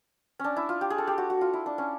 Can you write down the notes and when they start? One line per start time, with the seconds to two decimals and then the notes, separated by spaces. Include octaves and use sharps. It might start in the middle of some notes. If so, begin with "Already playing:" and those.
0.39 C#4 D4
0.56 E4
0.69 F4
0.81 G4
0.90 G#4
0.98 A4
1.07 G4
1.18 F#4
1.30 F#4
1.41 F4
1.53 E4
1.66 D4
1.78 C#4